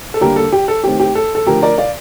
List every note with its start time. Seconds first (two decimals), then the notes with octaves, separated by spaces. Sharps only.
0.14 A4
0.21 D3 G3 A#3 G4 A#4
0.36 A4
0.53 G4
0.68 A4
0.84 D#3 A3 C4 G4
1.00 G4
1.15 A4
1.35 A4
1.47 D3 F3 A3 G4 A#4
1.62 A#4 D5
1.78 D5 F5